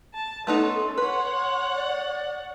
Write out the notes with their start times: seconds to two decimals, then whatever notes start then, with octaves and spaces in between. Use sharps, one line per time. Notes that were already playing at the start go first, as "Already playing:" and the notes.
0.14 A5
0.47 A3 B3 C#4 D#4 A4 C6
0.98 B4 C#5 F#5
1.76 D5